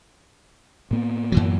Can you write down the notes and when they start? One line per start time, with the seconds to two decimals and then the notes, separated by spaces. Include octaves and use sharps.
0.91 A2 A#3 B3
1.32 F#2 E3 F#3